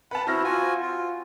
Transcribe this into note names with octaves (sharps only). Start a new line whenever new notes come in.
B4 F#5 A5 B5
C4 E4 F#4 F6 A#6
F4 F#4 G#5
F4